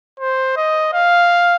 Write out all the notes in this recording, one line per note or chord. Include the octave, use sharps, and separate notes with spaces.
C5
D#5
F5